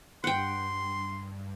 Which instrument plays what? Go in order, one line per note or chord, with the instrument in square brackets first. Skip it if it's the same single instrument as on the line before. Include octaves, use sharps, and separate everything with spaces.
[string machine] G2 [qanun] F#5 G5 [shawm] C6